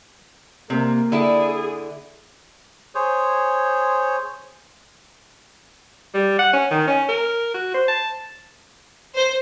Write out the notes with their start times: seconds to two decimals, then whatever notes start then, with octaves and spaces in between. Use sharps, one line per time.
0.70 C3 A#3
1.12 D3 E4 G#4
2.95 G#4 C5 C#5
6.14 G3
6.39 F#5
6.53 C#4
6.71 D#3
6.88 C#4
7.09 A#4
7.54 F#4
7.74 C5
7.88 A5
9.16 C5